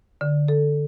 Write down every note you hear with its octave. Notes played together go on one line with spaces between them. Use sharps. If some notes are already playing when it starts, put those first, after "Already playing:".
D3
A4